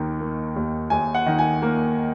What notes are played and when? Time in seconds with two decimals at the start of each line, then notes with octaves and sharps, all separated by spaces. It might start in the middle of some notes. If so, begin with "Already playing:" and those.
Already playing: D#2 D#3
0.21 A#3
0.56 D#2
0.90 D#2 G#5
1.15 F#5
1.26 D#3
1.39 G#5
1.62 A#3